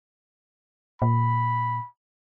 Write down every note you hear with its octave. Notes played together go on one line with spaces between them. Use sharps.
A#2 B5